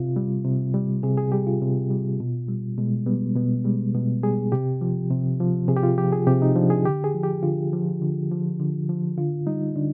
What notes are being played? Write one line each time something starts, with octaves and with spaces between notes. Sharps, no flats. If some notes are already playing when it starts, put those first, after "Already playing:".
Already playing: C3 F4
G3
C3
G3
C3 G#4
G#4
G3 G4
F4
C3
G3
B2
G3
B2 G#3
G3 B3
B2 B3
G3 G#3
B2 B3
G3 G#4
C3 G4
F3
C3
F3
C3 G#4
G4
F4
F3 G4
G#4
C3 G4
D#4
F3 D4
G#4
D3 G4
G#4
F3
G4
D3 F4
F3
D3
F3
D3
F3
D3 F4
G3 D#4
D3 D4